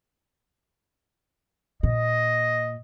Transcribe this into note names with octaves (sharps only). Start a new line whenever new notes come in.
A#2 D#5